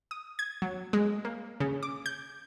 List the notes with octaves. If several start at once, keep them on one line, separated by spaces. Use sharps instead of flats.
D#6
G#6
F#3
G#3
A#3
C#3
D6
G6